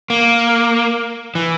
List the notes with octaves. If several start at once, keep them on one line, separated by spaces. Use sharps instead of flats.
A#3
E3